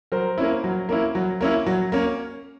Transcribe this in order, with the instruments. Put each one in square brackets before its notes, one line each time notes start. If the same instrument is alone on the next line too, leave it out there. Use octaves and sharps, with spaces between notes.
[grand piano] F#3 A#4 C5
A#3 C#4 E4
F#3
A#3 C#4 E4
F#3
A#3 C#4 E4
F#3
A#3 C#4